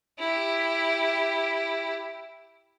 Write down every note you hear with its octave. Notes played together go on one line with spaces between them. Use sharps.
E4 G4